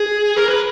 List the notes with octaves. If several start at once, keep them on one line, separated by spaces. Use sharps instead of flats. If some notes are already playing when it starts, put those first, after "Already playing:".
Already playing: G#4
A#4
B4